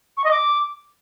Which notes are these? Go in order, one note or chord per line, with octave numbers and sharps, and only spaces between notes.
C#6
D#5
D6